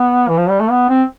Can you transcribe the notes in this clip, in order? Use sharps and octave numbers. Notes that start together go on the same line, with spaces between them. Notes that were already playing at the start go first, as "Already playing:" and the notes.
Already playing: B3
E3
F3
G3
A3
B3
C4